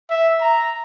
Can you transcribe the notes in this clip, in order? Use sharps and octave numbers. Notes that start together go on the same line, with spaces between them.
E5
A#5